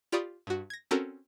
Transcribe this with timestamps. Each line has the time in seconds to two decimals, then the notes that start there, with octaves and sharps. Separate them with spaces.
0.12 F4 G4 D5 B5 C#6 D#6
0.47 G2 F#4
0.70 G#6 A#6
0.91 C4 C#4 F#4 A4 A#4